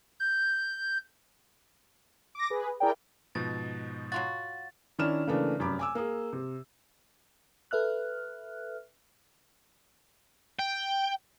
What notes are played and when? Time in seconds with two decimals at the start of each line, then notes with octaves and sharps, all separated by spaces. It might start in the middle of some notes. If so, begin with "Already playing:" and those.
0.20 G6
2.35 D6 A#6
2.50 G#4 B4
2.80 E4 G#4 A#4 D5 G5
3.35 G#2 B2 F3 A6
4.12 F#3 F4 F#4 A6
4.99 D#3 C#4 D4 E4 F6 E7
5.27 C#3 E3 A3 A#3 D4
5.59 F1 F#2 B5 D6
5.79 G#5 D6 E6
5.95 A#3 G#4
6.33 C3
7.71 A4 B4 E5 F6 F#6
10.59 G5